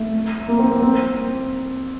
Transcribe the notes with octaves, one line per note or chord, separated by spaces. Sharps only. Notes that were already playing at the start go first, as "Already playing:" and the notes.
Already playing: A3
A#3
C4
A#3
C4